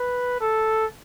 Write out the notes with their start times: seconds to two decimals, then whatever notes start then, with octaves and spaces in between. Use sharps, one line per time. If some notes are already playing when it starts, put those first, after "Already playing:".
Already playing: B4
0.41 A4